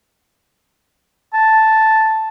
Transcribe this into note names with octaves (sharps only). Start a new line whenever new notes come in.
A5